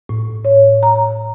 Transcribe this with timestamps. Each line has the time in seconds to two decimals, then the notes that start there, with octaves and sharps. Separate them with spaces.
0.09 A2
0.45 C#5
0.83 A#5